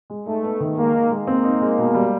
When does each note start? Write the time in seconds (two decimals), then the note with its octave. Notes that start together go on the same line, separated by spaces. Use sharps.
0.10 G#3
0.26 A3 D#4
0.43 B3
0.60 D#3
0.77 G#3 A#3
0.94 D#4
1.11 G#3
1.27 A#3 C4
1.44 D#4
1.61 G#3
1.78 B2
1.95 G3